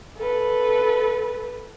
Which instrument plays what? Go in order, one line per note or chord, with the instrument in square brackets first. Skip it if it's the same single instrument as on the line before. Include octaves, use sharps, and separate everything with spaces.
[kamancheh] A4 B4